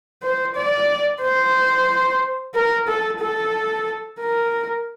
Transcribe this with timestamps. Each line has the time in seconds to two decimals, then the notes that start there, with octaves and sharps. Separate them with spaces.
0.23 C5
0.56 D5
1.22 C5
2.55 A#4
2.88 A4
3.20 A4
4.20 A#4